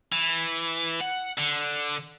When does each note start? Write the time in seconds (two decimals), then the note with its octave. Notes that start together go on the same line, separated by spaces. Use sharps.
0.12 E3
1.00 F#5
1.38 D3